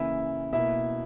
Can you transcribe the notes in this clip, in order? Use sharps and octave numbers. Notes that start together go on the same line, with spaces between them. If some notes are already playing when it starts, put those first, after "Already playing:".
Already playing: C#3 E3 A#3 E4 E5
B2 A#3 E4 E5